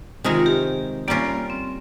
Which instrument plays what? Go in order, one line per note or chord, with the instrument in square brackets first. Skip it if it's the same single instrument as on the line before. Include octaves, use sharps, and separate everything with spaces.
[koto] C3 D#3 G#3 D#4 A#4 [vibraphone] F4
[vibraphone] G4
[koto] G3 C#4 F4 A#4 [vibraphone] A#3
[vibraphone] C4